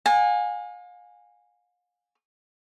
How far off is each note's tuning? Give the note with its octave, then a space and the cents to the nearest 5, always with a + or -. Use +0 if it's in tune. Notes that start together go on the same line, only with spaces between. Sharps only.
F5 +40 G#5 -15